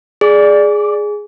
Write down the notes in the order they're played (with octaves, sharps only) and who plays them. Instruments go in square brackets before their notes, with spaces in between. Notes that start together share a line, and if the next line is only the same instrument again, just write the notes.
[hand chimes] G#4 [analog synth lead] D5